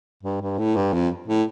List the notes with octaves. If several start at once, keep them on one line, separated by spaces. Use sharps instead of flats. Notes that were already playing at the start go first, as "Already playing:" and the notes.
G2
G2
A2
G2
F2
A2